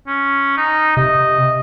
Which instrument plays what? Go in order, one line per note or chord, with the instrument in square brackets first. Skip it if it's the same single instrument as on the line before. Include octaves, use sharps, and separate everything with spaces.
[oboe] C#4
D#4
[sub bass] C3 [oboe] D#5